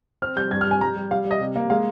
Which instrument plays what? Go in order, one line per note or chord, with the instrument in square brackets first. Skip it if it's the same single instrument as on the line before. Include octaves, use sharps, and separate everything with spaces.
[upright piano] C4 F6
G3 G6
G2 G#6
F6
G3
G#5
G3 A#5
G3
G3 F5
G3
D#5
C3
A#3
G#3 F5